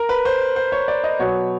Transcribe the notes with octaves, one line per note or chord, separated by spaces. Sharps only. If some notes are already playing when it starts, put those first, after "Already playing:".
Already playing: A#4
B4
C5
C5
C#5
D5
D#5
B2 F#3 B3 C#5